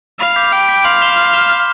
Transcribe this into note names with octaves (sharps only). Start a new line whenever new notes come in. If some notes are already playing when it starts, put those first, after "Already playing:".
F5 B5
D6 G6 B6
G5 B5
D6 G6 B6
F5 C6
F6 B6 E7 G7
C6
F6 B6 E7 G7
F6